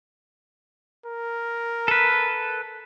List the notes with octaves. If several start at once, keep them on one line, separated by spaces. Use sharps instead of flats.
A#4
A4 B4